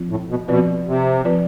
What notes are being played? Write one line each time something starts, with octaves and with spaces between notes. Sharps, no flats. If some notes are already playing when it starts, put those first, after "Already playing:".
Already playing: F3 C4 F4
A2
B2
B2 F3 C4 F4 B4 D5
C3
F3 C4 F4 B4 D5